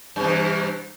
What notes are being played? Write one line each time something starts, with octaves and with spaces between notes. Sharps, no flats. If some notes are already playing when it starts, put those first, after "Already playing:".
G2 C3 E3